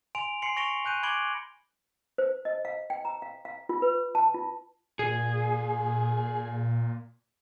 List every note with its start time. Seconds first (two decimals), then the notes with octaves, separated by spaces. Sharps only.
0.15 G#5 C6 D7 F7
0.42 G#5 C6 C7 C#7 F#7
0.56 C#6 A#6 C#7 D7 F7 G7
0.85 G#5 F#6 G6 D#7
1.03 B5 D6 G#6 D7 F#7 G7
2.18 C5
2.45 D#5
2.65 F5
2.90 G5
3.05 A#5
3.22 F5
3.45 F5
3.69 F4
3.82 B4
4.15 A5
4.34 F4
4.99 A#2 G#4